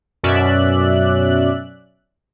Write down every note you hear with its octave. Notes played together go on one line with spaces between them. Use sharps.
F#2 B2 C#4 D5 E5 F#6